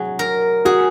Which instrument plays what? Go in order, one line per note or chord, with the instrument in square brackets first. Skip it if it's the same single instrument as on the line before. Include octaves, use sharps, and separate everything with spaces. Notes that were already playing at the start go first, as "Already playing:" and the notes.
Already playing: [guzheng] F#3 [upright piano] G#4
[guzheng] A#4
[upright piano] F#4 [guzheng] G#4